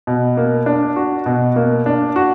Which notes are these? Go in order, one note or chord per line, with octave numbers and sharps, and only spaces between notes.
B2
A#3
D4
F#4
B2
A#3
D4
F#4